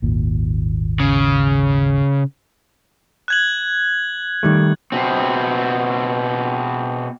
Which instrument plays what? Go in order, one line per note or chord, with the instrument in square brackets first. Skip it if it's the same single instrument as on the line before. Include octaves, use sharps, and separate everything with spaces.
[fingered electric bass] G#1 D#2 A#2
[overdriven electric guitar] C#3
[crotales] F#6 G#6 F#7
[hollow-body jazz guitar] D#3 G3 A3
[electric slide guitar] B2 C4